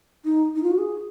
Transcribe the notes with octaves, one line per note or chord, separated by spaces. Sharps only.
D#4
D#4
F4
F#4
G#4